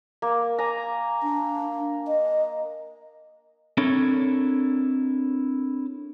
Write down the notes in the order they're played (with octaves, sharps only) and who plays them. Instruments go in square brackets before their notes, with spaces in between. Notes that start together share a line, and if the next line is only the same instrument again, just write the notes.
[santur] A#3
G#5 A#5
[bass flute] D4
D#5
[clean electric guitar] C4 D4 E4 A4 A#4 C#5